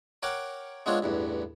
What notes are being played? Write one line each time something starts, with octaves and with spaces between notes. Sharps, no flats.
A#4 C#5 F#5 G5 D6
G#3 B3 C4 D4 F4 C#5
A1 E2 G2